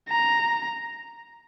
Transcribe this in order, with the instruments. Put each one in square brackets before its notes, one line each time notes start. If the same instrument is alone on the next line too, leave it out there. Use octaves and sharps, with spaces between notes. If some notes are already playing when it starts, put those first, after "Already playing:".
[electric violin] A#5